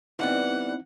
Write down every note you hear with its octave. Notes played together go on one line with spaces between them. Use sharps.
E3 G3 B3 C4 D#4 E4 F#5